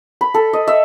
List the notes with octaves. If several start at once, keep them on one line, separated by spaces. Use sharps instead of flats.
B5
A4
D#5
E5